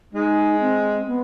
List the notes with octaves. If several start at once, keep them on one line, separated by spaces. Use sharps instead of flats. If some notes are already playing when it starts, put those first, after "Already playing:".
G#3 D#4
C4
B3